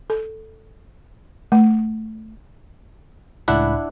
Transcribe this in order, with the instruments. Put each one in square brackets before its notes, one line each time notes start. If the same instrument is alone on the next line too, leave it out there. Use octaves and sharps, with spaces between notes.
[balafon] A4
A3
[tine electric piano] C#2 A2 B5 [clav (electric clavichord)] D4 E4 F#5